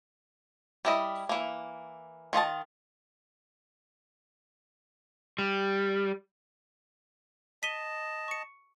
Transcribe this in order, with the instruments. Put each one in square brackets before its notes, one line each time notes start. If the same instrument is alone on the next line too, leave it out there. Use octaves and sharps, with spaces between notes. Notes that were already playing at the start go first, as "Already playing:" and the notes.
[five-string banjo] G3 E4 D#5
E3 A#3
D#3 F4 D#5 A5
[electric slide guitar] G3
[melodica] D#5 A5 [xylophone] B6 D#7 G7
[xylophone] C#6 C#7